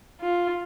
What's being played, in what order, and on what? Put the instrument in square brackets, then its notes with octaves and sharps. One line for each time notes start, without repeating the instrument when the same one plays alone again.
[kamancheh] F4